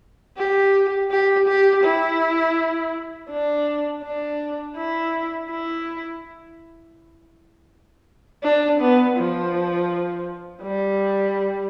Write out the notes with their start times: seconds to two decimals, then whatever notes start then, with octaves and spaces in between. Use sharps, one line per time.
0.38 G4
1.11 G4
1.48 G4
1.84 E4
3.30 D4
4.03 D4
4.76 E4
5.50 E4
8.43 D4
8.80 B3
9.17 F3
10.63 G3